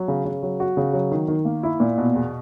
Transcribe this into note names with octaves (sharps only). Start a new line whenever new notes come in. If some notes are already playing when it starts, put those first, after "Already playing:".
Already playing: F#3
C#3
C#3
F#3
F#4
C#3
F#3
D#3
D#3
A#3
E4
A#2
B2
E2